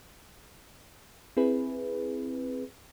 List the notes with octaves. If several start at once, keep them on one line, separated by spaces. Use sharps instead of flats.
C4 E4 G#4 B4